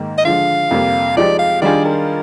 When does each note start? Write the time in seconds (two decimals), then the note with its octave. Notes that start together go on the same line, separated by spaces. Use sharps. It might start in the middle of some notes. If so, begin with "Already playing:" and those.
Already playing: G#2 D#3 A#3
0.18 D#5
0.25 D3 F3 G#3 F5
0.71 F2 C3 G3 A#3
1.17 F3 G#3 D#4 G4 D5
1.39 F5
1.62 D#3 G3 D4 F4 G#4 D5
1.85 A#4